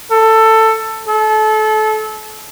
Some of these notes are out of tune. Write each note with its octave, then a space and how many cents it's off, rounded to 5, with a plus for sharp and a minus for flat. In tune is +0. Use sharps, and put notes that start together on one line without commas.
A4 +15
A4 -30